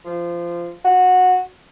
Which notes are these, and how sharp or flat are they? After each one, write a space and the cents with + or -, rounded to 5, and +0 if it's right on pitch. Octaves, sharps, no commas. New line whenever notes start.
F3 -20
F#4 -15